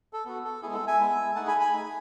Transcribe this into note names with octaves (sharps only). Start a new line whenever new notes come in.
A4
B3 F#4
A4
G#3 B3 E4 G#4
A4
E5 G#5
G#3 B3 E4
A3 D#4 G#4 F#5 A5
G#5 B5
G#5 B5
A3 D#4 G#4